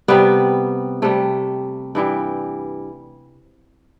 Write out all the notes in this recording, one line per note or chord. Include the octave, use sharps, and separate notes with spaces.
C3 G3 B3
C3 G3 A3
G2 E3 G3